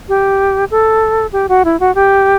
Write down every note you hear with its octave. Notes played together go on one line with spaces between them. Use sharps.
G4
A4
G4
F#4
E4
F#4
G4